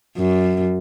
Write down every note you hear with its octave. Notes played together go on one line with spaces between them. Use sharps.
F#2